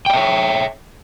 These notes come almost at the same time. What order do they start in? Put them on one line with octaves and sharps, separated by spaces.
G5 D5 E5 C#5